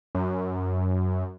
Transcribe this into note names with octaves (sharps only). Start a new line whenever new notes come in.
F#2